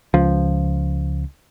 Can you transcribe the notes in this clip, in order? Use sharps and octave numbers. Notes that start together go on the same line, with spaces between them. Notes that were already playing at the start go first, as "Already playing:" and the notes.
C#2 F3